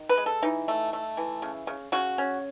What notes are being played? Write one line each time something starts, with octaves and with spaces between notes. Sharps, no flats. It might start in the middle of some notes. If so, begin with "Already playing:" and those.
Already playing: D#3
B4
G#3
A4
E3 D#4
A3
A3
E3
C#3
C#3
C#3 F#4
C#4